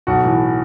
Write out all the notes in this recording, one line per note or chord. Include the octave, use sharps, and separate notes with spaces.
B1 F#4
A2 E3